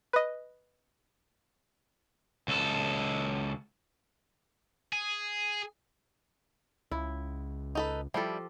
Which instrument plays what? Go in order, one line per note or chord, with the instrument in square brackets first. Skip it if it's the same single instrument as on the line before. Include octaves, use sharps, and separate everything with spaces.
[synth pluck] B4 D#5
[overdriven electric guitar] C#2 A4
[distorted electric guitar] G#4
[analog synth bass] C#2 [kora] E4
[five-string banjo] D#4 A4 B4
[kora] F3 G4 A4 [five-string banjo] G3 E4